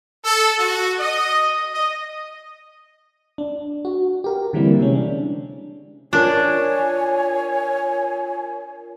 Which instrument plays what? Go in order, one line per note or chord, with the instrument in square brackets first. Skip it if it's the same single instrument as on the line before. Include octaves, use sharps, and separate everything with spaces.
[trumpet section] A4
F#4
D#5
D#5
[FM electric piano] D4
F#4
G4 A#4
D3 E3 G3 A#3 C4 E4
C3 G#3 C#4
D4
[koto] D4 [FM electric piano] F4 A#4 [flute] C#5 [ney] G#5